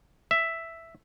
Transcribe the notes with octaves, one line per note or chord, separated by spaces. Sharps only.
E5